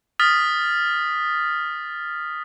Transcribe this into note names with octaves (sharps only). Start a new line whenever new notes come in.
D#6 F6 A6 B6